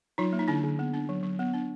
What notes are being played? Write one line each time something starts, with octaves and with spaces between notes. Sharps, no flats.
F#3 D#4 F4
A#3
D#4
D3 D4 E4
D3
B3
D4
F#3
F#3
B3
D4